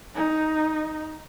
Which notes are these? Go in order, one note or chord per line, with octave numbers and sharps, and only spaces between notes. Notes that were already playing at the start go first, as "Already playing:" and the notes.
D#4